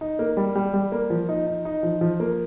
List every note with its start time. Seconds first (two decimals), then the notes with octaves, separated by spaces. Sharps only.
0.01 D#4
0.19 A#3
0.37 G3
0.55 G3
0.74 G3
0.92 A#3
1.10 F3
1.29 D#4
1.47 D#4
1.65 D#4
1.83 F3
2.01 F3
2.20 A#3